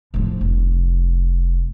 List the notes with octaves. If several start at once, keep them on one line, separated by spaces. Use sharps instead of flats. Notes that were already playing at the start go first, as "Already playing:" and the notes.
A2 F3
F1